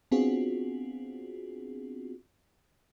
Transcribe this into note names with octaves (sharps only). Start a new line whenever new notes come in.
B3 C4 D4 F4 F#4 G#4